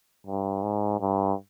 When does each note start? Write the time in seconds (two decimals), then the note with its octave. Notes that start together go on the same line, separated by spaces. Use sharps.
0.27 G2
0.63 G#2
1.00 G2